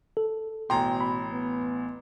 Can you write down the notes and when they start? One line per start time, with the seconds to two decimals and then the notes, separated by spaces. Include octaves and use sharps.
0.17 A4
0.70 A1 B2 G5 A#5 C6
1.01 B5
1.32 B3